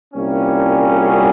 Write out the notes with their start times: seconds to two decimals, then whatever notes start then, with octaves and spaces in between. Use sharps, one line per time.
0.14 C2 A#2 G3 A#3 C#4
0.89 F#4 G#4